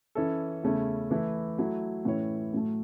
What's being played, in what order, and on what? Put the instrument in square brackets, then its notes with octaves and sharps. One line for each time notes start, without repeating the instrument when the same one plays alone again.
[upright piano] E3 C#4 E4 A4
E2 C#3 A3 C#4 E4
E3 A3 E4
F#3 A3 E4
A2 E3 C#4 E4 C#5
A2 F#3 A3